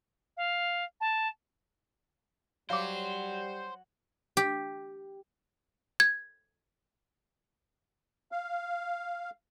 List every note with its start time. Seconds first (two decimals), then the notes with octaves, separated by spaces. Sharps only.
0.37 F5
1.01 A5
2.70 F#3 G3 C5 F5 D6
4.37 G4
6.00 G#6
8.32 F5